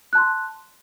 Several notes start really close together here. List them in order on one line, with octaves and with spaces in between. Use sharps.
F#6 A5 C6